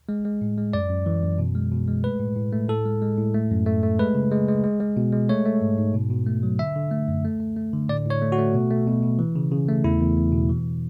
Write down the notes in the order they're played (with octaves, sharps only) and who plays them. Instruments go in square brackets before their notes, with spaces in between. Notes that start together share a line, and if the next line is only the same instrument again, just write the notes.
[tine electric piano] G#3
G#3
A2
G#3
F#2 D5
F#2
E3
F#2
B2
G#3
B2
G#3
A3 B4
A2
A2
A3
A2 A4
G#3
G#3
A2
A3
F#2
A3
A3
G#3 B4
C#3
G#3
G#3
G#3
G#3
B2
G#3
A3 C#5
A3
G#2
G#2
B2
B2
A3
F#3
D3 E5
D3
A3
F#2
A3
A3
A3
D3
A2 D5
A2
C#5
A3
F#4
A3
B2
A3
B2
B2
E3
C#3
C#3
A3
E2 E4
E2
E2
B2
E3